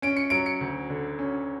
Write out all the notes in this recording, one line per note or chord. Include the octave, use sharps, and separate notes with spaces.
C#4 D7
C#7
F#3 D7
C#7
D2
D3
C#4